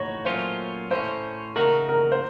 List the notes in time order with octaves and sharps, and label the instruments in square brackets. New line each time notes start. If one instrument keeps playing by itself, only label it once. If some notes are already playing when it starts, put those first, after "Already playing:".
Already playing: [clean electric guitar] A2 D#4 F#4 [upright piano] C#5
[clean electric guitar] A#2 F#3 A3 C#4 F4 [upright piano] C5
[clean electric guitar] A2 A3 C#4 [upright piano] C5
[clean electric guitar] C#3 A3 D#4 F#4 [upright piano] A#4
[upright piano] A#4
C5